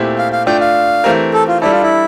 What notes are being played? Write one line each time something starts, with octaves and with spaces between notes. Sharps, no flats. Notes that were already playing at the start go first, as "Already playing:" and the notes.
Already playing: A#2 A3 C4 E4 G4
F5
F5
A3 D4 F4 G5
F5
E3 A3 C4 G4 A#4
A4
F4
G3 D4 E4 A4
F4
E4